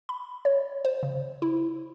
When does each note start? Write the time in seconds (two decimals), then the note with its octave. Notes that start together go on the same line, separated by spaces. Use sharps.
0.09 B5
0.45 C#5
0.85 C5
1.03 C#3
1.42 E4